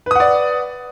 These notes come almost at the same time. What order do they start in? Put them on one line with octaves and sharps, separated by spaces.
B4 D#6 F#5 D5